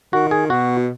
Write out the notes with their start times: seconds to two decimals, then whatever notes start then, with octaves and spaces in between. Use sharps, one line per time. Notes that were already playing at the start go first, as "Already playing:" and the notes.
0.13 D#3 F#4
0.31 G#4
0.50 B2 F#4